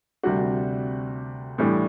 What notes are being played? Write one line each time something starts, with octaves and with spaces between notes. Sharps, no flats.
D2 C3 G3 D4 F#4
A2 E3 G3 D4